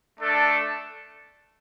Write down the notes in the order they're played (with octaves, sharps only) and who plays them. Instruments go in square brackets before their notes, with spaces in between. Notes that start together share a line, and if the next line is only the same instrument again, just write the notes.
[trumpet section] A3 D4 A4